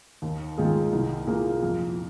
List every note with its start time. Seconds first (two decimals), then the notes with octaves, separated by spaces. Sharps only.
0.22 D#2
0.58 D#3 G#3 F4 G#4
0.93 C2
1.27 A#2 A#3 G#4
1.63 F2